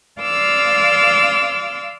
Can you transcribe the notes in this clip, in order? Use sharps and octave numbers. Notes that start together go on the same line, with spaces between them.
D5 F5 C6 D6 E6 F6